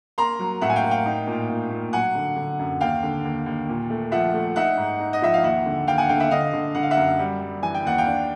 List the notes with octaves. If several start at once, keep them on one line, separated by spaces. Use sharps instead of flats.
A#3 A#5 C6
F#3
A2 E5 F#5
G#5
F5 G5
A#3
F5 G5
D#4
A#2
A#2
A#2
F#3 F#5 G#5
D3
D3
F#2
D#2 F5 G5
D3
D#2
D#2
A#2
A3
F3 E5 F#5
A3
D#4 E5 F#5
G#2
D#4
D#5
F3 E5
F5
D#2 E5 F#5
D3
D#2 F5 G5
F#5 G#5
D3 F5 G5
E5 F#5
D3 D#5 F5
D3
D3 F#5
F5
E5 F#5
F#2
G3
G3
E3 G#5
G5
D#2 F#5
F5 G5
D4